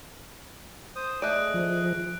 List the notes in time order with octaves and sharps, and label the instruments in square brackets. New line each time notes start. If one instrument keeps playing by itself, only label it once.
[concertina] C5 D#6
[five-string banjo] A3 D5 [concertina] G#4 D#5 [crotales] F#6 D7
[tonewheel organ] F3